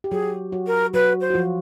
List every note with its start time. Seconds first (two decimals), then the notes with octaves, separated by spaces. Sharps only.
0.04 G4
0.11 F#3 F#4 G#4
0.52 F#3 F#4
0.67 A#4
0.94 F#3 F#4 B4
1.20 C5
1.30 F#4
1.34 F3 F4